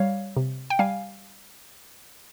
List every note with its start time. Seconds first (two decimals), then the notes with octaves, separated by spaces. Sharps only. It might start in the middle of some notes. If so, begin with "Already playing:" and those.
Already playing: G3 C#5 F5
0.37 C3
0.70 G5
0.79 G3 F5 G#5